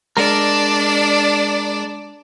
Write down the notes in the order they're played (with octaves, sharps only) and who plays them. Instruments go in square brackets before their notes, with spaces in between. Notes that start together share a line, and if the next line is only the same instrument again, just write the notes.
[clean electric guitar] G#3 A#4 [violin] D4 D5